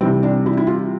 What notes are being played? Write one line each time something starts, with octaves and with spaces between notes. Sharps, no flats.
C3 E3 G3 C4
D4
E4
E4
F4